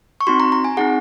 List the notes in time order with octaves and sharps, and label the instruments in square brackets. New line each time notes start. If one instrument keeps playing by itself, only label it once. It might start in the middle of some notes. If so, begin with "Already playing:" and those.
[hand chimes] C#6
C4 D#4 F#4 C6
A#5
A#5
G#5
C4 D#4 G#4 F#5